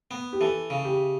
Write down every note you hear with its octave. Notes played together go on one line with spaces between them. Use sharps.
B3
G4
E3 A4
C#3
G4